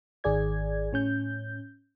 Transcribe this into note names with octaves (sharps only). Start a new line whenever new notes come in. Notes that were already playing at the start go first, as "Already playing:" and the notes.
G#1 D#3 G#4 D5 G#6
A2 C#4 G6